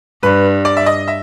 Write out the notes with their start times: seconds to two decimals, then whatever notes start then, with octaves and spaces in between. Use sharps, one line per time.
0.23 G2 B4
0.65 D5
0.77 E5
0.86 D#5
1.08 E5